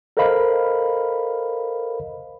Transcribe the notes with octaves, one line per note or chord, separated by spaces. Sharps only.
A4 A#4 C5 D#5 F5 B5